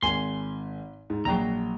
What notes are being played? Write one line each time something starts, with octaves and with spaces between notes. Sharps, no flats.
G#1 G#5 C6
G#2
A#1 F#3 G5 A#5